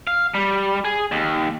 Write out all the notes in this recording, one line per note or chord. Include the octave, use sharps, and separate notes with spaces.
F5
G3
G#4
D#2